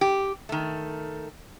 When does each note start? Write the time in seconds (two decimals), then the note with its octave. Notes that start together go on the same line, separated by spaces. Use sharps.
0.01 G4
0.49 D#3 A3